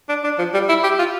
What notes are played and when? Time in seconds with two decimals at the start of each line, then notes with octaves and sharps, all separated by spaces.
0.09 D4
0.24 D4
0.39 F3
0.54 G3
0.69 E4
0.84 G4
0.99 F4